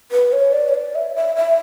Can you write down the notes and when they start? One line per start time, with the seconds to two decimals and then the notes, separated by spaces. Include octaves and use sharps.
0.12 B4
0.33 C#5
0.53 D5
0.69 C#5
0.74 D5
0.95 E5
1.16 E5
1.36 E5